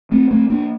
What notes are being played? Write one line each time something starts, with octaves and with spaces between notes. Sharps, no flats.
A3 C4
A3 C4
A#3 D4